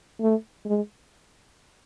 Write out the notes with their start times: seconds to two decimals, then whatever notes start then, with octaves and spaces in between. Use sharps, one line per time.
0.21 A3
0.65 G#3